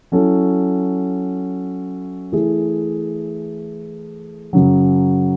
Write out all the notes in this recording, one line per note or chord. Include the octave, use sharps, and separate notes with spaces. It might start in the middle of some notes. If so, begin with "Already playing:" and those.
F#3 C#4 E4 A4
E3 A3 E4 G#4
F#2 C#3 F#3